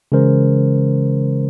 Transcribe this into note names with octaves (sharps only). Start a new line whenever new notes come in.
C#3 E3 G#3 C#4 A#4 C5